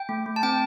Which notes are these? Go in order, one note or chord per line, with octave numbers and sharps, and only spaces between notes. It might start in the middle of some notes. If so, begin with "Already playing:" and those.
Already playing: G5
A3
A3
A5
C4 G5